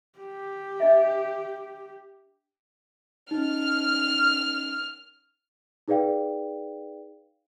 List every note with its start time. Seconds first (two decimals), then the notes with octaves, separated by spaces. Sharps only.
0.19 G4
0.80 D4 D#5 E5
3.31 C#4 D#4 F6
5.88 D#4 G#4 B4 D5 F5 G5